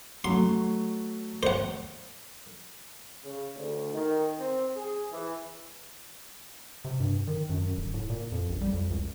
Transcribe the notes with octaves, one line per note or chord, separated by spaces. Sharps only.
F#3 A3 C6
C5 F#5
C#3
D2
D#3
C4
G#4
E3
C3
G2
D#3
F#2
D1
A2
A#2
F2
A#1
G3
F2
C#2